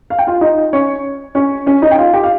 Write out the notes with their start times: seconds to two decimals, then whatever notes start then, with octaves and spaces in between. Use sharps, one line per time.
0.10 F5
0.19 G5
0.27 F4 F5
0.41 D#4 D#5
0.73 C#4 C#5
1.35 C#4 C#5
1.66 C#4 C#5
1.82 D#4 D#5
1.91 G5
1.98 F4 F5
2.13 G4 G5
2.24 F5